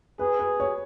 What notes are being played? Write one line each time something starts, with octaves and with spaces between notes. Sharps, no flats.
G#4 B4
B4
C#5